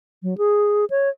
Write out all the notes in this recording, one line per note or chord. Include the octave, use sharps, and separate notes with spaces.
F#3
G#4
C#5